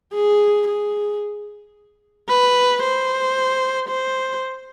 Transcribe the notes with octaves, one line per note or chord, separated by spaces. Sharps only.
G#4
G#4
B4
C5
C5